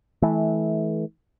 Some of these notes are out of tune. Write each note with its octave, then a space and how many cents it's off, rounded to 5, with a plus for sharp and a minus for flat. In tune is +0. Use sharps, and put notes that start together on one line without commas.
E3 -25 A3 -35